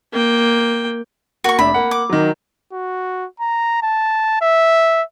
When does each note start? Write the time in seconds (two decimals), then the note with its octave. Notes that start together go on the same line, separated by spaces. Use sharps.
0.13 A#3 G5
1.44 A#3 F#4 C#6
1.59 F1 D4 E5 B5
1.74 A#3 F#5
1.91 D6
2.09 D#3 F#3
2.73 F#4
3.40 A#5
3.82 A5
4.41 E5